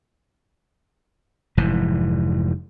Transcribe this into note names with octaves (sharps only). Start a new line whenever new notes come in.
F1 G#2 E3